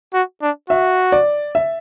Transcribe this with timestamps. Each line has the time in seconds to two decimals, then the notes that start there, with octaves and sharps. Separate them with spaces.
0.14 F#4
0.42 D4
0.70 F#4 E5
1.12 D5
1.55 E5